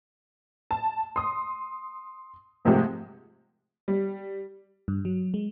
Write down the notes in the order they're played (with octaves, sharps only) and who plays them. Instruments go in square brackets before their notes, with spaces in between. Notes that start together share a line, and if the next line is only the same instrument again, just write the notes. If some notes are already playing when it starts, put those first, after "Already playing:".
[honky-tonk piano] A5
C6 D#6
G#2 C3 F3 G#3 A3 G4
G3
[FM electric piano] G2
F#3
G#3